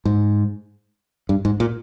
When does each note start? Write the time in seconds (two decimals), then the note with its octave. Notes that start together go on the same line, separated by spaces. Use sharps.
0.05 G#2
1.29 G2
1.45 G#2
1.60 A#2